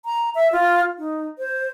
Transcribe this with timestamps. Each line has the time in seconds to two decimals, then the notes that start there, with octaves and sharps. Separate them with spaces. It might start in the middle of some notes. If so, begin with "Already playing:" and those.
0.05 A#5
0.35 E5
0.52 F4
0.98 D#4
1.39 C5